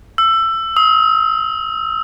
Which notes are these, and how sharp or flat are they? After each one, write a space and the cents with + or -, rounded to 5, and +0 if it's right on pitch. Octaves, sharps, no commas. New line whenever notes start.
E6 +20
D#6 +45